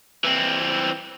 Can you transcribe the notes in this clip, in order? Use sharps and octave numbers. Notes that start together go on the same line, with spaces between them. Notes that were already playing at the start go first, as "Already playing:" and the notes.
E3 C4